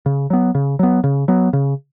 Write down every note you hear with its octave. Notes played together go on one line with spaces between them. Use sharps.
C#3
F#3 B3
C#3
F#3 B3
C#3
F#3 B3
C#3